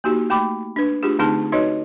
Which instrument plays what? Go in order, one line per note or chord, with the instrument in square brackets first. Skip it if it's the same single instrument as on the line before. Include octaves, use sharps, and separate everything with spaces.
[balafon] A#3 D#4 F#4 G4
A3 G5 B5 D6
D4 B4
A3 D4 F4 G4 G#4
D3 A3 C4 D#4 G#4 A5
D#4 F#4 B4 C#5 D#5